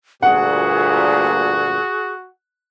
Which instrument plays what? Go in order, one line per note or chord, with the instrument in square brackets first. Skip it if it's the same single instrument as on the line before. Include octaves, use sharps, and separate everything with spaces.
[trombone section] D2 G2 A#2 [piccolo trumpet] F#4 [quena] G#4 [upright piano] F#5